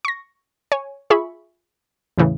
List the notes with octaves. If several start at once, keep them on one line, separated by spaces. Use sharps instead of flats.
C#6 A#6
C#5 G#5
F4 G#4 E5 B5 C#6
E2 A2 C#3 E3